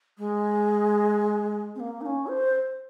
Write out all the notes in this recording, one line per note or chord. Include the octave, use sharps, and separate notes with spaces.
G#3
C4
A#3
D#4
C#4
C5